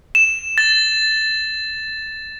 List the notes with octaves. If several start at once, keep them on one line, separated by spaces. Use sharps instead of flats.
E7
A6